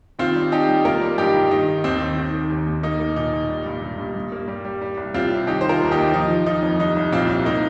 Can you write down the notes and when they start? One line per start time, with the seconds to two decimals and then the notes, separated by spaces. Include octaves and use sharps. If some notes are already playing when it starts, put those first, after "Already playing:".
0.19 D#3 C4 F4
0.36 G3
0.52 G3 D#4 G4
0.69 G3
0.85 A#3 F4 A#4
1.01 G3
1.18 G2 D#4 G4
1.34 G2
1.51 D#3 D#4
1.67 D#3
1.84 D#2 C4
2.01 D#3
2.17 D#3
2.33 D#3
2.50 D#2
2.67 D#2
2.83 A#3 D#4
3.00 A#3
3.16 A#2 D#4
3.32 A#2
3.49 G3
3.66 G2
3.82 G2
3.98 G2
4.16 G2
4.32 A#3
4.48 G3
4.65 G3
4.82 G3
4.97 C2
5.14 C2 C4 F4
5.31 C3
5.47 D#3 D#4 G4
5.61 D#3 C5
5.69 F4 A#4
5.81 D#2
5.91 D#4 G4
5.97 D#2
6.14 F3 D#4
6.30 F3
6.46 F3 D#4
6.63 F2
6.80 C2 D#4
6.96 C2
7.12 A#2 C4 F4
7.29 C2
7.45 A#3 D#4